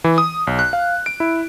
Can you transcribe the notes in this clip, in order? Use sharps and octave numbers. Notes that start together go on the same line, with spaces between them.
E3
D#6
B1
F#6
F5
D7
E4